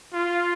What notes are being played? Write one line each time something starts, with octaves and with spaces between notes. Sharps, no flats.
F4